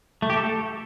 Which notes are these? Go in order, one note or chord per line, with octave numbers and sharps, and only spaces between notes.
A3
G4
A4